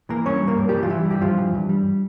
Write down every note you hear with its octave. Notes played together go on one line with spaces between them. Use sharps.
E3 A#3 A#4
G2 C#4 C#5
G3
A#3 A#4
G2
G3 G4
E3
F4
G2 E3 E4
G3
G4
G2 F3 F4
E3
G2
G3